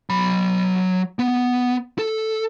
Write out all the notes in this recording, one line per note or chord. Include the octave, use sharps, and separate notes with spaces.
F#3 B5
B3
A4